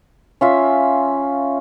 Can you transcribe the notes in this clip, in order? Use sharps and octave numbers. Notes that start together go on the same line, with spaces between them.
C#4 F4 E5